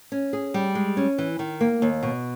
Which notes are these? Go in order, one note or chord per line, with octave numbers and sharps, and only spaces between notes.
C#4
G#4
G3
G#3
C#4
E3
D#3
A#3
D#2
B2